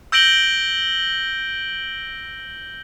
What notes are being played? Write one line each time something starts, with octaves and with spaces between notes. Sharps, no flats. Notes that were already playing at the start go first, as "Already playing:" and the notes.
E6 G6 A#6 D7 F#7 G7